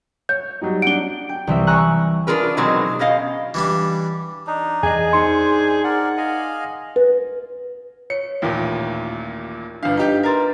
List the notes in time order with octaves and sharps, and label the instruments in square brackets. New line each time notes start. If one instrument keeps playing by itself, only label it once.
[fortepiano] C#5 [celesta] G6
[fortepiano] F#3 G3 D#4
[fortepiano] D4 F#5 [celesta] D7 G7
[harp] G5
C2 E3 E5
G#5 A#5 C#6 E6 F#6
[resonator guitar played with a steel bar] D4 F4 G#4 A#4 B4
B2 D#3 F#3 G#3 C4 F#4
B2 C#4 D#5 F5
[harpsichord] E3 G3 D4
[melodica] D4 D#4
[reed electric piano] E2 [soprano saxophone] G#4 [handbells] D#5 G#5
[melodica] D4 C5 [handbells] D#4 C#7 [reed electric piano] C6
[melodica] A#4 D5 [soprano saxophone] F#5
[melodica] D#5 F5 G#5
[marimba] B4
[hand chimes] C#5 [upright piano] C#7
[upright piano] A1 D#2 A#2 [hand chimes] G5
[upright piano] G1 F5 [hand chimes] D4 B4
[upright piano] D#4 G4 G6
[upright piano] A#4 A6 [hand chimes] B4 A#5 C6